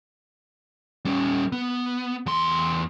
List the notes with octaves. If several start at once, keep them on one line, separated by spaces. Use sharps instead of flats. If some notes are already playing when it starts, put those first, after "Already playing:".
G3 C#4
B3
E2 C6